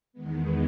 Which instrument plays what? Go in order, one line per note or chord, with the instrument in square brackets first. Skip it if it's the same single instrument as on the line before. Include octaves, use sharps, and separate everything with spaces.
[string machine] E2 D#3 G#3 B3